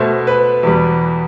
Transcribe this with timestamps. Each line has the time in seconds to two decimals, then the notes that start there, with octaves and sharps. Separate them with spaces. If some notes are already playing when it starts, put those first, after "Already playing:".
Already playing: B2 A3 C5
0.27 B4
0.63 E2 B2 G3